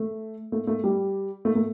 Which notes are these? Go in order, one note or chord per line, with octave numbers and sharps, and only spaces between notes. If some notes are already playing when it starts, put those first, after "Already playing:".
Already playing: A3
A3
A3
G3
A3
A3